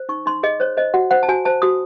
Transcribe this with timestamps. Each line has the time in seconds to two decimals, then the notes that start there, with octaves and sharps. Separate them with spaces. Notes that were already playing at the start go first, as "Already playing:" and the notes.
Already playing: C5
0.09 D#4 C#6
0.26 D#4 C6
0.43 G#4 D#5
0.60 C5 C#5
0.77 C5 D#5
0.94 F#4 F#5
1.11 C5 F#5
1.23 A5
1.29 F#4 G#5
1.45 C5 A5
1.62 F#4 D#6